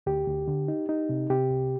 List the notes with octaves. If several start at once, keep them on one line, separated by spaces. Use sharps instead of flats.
D2 G4
D2
D3
D#4
D#4
C3
C3 G4
C2